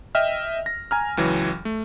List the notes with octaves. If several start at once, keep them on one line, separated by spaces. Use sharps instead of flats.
D#5 E5 G5 F6
A#6
G#5 A#5 F6
C#2 E3 F#3
A3